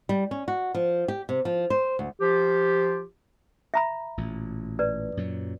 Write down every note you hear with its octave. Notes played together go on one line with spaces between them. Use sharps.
G3
C#4
F#4
F3
G4
C3
F3
C5
D2
F3 F4 G4
E5 A#5 B5
A1 A#2
B4 D5
F#2 A#2 F#3